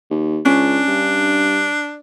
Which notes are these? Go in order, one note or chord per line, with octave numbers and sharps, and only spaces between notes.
D#2
C#2 C#4 D4
G2